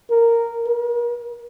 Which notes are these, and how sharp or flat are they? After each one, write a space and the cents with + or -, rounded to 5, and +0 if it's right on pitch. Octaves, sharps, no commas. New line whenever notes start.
A#4 -5
A#4 +40